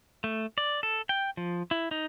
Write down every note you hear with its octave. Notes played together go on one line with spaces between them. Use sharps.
A3
D5
A4
G5
F3
E4
D#4